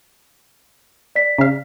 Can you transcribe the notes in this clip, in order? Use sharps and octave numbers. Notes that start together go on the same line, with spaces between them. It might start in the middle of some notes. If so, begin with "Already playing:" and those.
D5 B6
C#3 F5